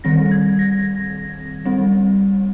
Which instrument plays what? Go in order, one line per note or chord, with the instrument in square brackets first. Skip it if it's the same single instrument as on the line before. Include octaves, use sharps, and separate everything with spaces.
[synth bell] D#3 G3 C4 A#6
G#6
A#6
G3 C4